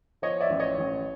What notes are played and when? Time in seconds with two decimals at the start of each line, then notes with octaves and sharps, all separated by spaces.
0.22 F3 C#5 D#5
0.40 D5 E5
0.50 A1
0.59 C#5 D#5
0.78 A1